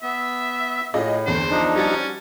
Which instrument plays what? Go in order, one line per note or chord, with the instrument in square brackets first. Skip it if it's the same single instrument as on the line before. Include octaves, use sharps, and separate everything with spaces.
[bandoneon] B3 [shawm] E5
[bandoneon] A2 [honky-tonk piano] F4 G#4 D#5
[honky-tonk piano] E2 D3 [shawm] C5
[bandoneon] F3 D4 D#4
[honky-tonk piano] G3 F#4 A6 [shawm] C#4